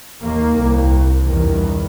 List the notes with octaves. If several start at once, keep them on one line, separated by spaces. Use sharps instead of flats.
D#2 A#3
C2
E2 G2 D#3